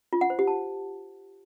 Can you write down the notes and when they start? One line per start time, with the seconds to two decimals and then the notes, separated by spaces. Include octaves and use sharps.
0.13 F4
0.21 F#5
0.30 C5
0.39 G4
0.47 A5